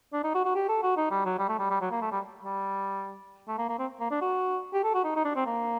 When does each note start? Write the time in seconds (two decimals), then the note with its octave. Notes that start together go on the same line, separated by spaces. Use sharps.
0.13 D4
0.24 D#4
0.35 F#4
0.45 F#4
0.55 G4
0.69 A4
0.83 F#4
0.97 D#4
1.11 G3
1.25 F#3
1.38 G3
1.49 A3
1.59 G3
1.70 G3
1.81 F#3
1.91 A#3
2.02 A3
2.12 G3
2.44 G3
3.48 A3
3.58 A#3
3.69 A#3
3.79 C4
4.00 A#3
4.11 D4
4.21 F#4
4.73 G4
4.84 A4
4.94 F#4
5.04 D#4
5.16 D#4
5.25 D4
5.36 C4
5.46 A#3